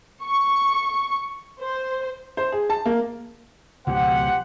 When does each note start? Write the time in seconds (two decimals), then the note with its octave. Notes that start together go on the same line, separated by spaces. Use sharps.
0.23 C#6
1.61 C5
2.37 C5
2.52 G#4
2.70 A5
2.85 A#3
3.87 C#2 B2 F3 G4 C5 F#5